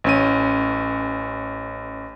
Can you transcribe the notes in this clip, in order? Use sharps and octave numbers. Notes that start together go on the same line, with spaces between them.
A1 C#4 D#7